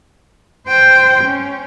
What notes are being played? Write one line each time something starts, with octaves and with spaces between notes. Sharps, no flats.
C5 G5
C#4